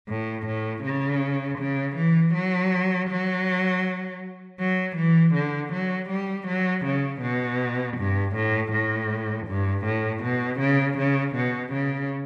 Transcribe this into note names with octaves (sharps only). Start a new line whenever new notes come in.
A2
A2
C#3
C#3
E3
F#3
F#3
F#3
E3
D3
F#3
G3
F#3
C#3
B2
G2
A2
A2
G2
A2
B2
C#3
C#3
B2
C#3